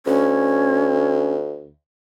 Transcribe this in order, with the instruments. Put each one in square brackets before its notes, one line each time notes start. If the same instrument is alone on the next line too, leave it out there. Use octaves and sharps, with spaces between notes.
[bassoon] D2 [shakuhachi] C#4